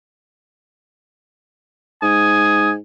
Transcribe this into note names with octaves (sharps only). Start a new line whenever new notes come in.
G#2 G#5 D#6